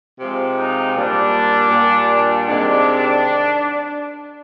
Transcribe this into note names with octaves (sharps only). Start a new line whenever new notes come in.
C3 F3 G#3
D#4
A#2 G3 D4
A#2 G3
C3 D#3 G#3 D4